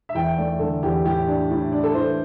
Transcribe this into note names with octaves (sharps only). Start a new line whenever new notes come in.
E5
E2 G5
A3 D5
D3 A4
E2 G4
A2 G4
D4
A2
D4
A4
E3 C5